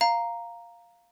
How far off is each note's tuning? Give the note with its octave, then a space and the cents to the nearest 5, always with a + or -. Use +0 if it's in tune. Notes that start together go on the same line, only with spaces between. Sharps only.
F5 +0 A#5 +0